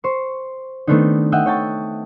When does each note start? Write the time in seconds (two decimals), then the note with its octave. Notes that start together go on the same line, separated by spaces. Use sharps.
0.04 C5 C#6
0.87 D#3 A3 B3 C4 D4 D#4
1.32 D#5 E5 F#5 G5
1.46 C#5 G5 A5 C#6